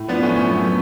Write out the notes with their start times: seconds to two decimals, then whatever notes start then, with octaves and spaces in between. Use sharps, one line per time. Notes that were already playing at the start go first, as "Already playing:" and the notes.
Already playing: A2
0.08 F3 B3 D4
0.23 A3 C#4
0.30 F3
0.36 C#4
0.50 F#2 B3
0.62 A3